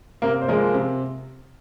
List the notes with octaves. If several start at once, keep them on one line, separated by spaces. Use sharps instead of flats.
C3 A#3 A#4
C5
F3 G#3 A#3 A#4
C3